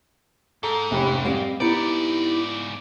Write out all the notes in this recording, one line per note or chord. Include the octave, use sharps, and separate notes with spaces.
G#2 A4 A#5
F1 B3 C#4 G4 G#4 B5
G3 C4 D#5 F5
G#2 B3 D#4 E4 G4 D5 B5 C#7